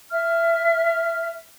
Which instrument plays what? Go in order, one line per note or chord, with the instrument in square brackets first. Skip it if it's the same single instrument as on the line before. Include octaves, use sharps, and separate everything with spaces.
[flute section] E5 F6